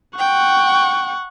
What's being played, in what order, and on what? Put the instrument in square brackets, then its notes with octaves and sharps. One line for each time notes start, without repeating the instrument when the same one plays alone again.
[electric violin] F#5 C#6 [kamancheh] G5